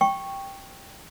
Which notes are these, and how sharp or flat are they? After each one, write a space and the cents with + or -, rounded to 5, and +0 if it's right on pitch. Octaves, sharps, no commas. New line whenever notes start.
G5 +0 C#6 -10